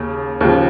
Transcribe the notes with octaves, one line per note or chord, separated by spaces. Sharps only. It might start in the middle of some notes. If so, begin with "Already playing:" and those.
Already playing: D#2 C#3
D#2 C#3 F3